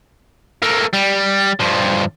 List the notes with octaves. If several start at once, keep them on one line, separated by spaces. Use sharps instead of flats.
A3 A#3
G3
G2 F3